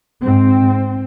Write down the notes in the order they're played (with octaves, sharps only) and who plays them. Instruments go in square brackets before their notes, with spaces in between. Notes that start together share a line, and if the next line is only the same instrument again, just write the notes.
[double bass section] G#2 C4